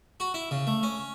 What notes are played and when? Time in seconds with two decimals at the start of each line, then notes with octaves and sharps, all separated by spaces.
0.20 F#4
0.34 E4
0.51 C#3
0.67 A3
0.83 C#4